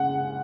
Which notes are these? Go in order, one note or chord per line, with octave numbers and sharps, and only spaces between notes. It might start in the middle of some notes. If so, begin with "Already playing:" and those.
Already playing: C#3 G#3 F#5